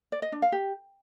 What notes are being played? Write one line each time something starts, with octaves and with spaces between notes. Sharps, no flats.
D5
D#5
D4
F5
G4